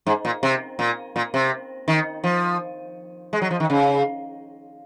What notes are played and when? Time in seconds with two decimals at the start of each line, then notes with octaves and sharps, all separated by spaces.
0.07 G#2
0.25 A#2
0.43 C3
0.79 A#2
1.16 A#2
1.34 C3
1.88 D#3
2.24 F3
3.33 G#3
3.42 F#3
3.51 F3
3.60 D#3
3.70 C#3